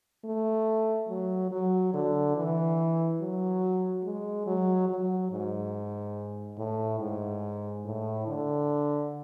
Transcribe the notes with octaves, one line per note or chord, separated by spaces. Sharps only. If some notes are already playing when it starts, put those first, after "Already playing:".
A3
F#3
F#3
D3
E3
F#3
G#3
F#3
F#3
G#2
A2
G#2
A2
D3